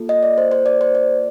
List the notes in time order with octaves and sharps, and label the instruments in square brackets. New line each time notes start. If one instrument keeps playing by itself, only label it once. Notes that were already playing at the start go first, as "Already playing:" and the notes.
Already playing: [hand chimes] A#3 F4 A4
D#5
D5
C5
C5
D5
C5
D5